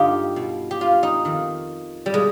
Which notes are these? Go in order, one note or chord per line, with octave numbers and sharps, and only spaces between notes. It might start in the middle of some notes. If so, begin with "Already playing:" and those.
Already playing: G2 D3 D#4 F4 G4
B2
G4
F4
D#4
F2 D#3
G3
B2 G#3